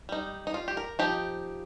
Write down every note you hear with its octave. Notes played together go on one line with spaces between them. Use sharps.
G3 D#4
D#4
F4
G4
A#4
F3 D#4 G4